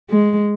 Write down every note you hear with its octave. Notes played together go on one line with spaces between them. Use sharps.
G#3